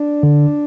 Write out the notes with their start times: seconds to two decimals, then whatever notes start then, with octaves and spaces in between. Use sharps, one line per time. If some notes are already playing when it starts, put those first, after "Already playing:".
Already playing: D4
0.23 D3